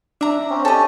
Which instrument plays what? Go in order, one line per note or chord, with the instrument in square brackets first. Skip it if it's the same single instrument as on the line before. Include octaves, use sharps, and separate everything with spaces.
[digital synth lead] D4 [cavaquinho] E5 A#5
[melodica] C4 C#4
[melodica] C#4 G4 [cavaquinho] A4 D#5